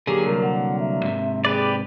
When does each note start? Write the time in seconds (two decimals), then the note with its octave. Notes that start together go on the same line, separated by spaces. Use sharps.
0.07 D3 F#3 A#3 G4 G#4
0.27 C2 A#4
0.43 F#5
0.80 E5
1.03 G#2 C3
1.45 G4 G#4 B4 D5